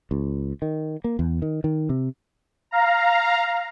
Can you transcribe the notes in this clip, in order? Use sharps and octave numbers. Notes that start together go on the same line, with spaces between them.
C#2
D#3
A#3
E2
D#3
D#3
C3
F5 A#5